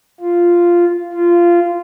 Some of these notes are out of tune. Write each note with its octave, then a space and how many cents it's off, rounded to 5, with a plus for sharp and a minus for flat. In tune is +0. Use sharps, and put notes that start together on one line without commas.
F4 -5
F4 -15